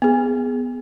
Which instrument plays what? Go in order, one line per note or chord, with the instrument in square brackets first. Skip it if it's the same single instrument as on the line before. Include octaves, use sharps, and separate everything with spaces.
[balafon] B3 G#4